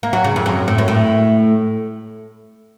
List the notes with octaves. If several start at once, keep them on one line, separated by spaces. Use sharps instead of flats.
A#3
F#3
C#3
F2
F#2
A2
F#2
A2